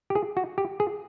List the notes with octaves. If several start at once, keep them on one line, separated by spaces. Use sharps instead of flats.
G4
G#4
F#4
G4
G#4